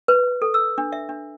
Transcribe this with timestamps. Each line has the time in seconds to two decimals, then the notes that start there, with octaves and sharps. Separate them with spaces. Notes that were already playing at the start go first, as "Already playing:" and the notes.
0.08 B4
0.42 A4
0.54 E6
0.78 D4
0.93 E5
1.09 D4